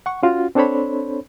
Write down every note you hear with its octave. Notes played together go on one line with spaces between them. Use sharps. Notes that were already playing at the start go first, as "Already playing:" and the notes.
F#5 C#6
C#4 F4 F#4
C4 D4 A4 C5 C#5 B5